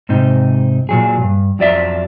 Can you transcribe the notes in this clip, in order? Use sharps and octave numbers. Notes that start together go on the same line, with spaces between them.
G#2 C3 D#4
A#2 F#3 G#4
G2
F2 F#3 D5 E5